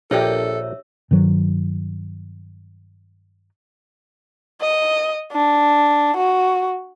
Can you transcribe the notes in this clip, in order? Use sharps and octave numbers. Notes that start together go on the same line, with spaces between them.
A#1 D4 G4 A4 A#4 C#5 E5 E6
G2 D#3 F#3
D#5
D4
F#4